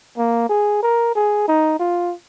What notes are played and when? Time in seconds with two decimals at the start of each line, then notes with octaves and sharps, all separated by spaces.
0.18 A#3
0.49 G#4
0.83 A#4
1.15 G#4
1.48 D#4
1.79 F4